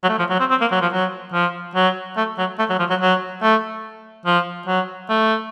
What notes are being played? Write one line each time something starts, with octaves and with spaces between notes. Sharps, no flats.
F#3
A3
F3
F#3
C4
C4
A#3
F#3
F3
F#3
F3
F#3
A3
F#3
A3
F#3
F3
F#3
F#3
A3
F3
F#3
A3